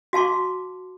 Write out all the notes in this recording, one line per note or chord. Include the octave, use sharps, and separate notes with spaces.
F#4 F5 A5 C6 D6